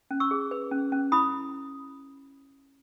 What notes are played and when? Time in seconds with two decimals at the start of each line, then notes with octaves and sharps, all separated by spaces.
0.11 C#4
0.20 C#6 E6
0.31 G#4
0.51 B4
0.71 C#4
0.92 C#4
1.12 E4 B5 D#6